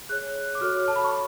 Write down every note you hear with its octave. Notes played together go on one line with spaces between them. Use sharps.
G#4 C#5 F#6
D6
F#4 A4 C#5 F6
A5
B5
C#6